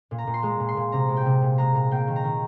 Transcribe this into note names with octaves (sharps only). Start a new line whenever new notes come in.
A#2
A#5
A#2
C6
G#3 A#5
A#2
C6
A#2
C3 A#5
G#3
G5
C3
A#2
G#3 A#5
A#2 A#5
A#3 G5
D#3
A#5
D#3